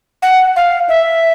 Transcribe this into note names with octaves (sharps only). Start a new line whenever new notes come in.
F#5
F5
E5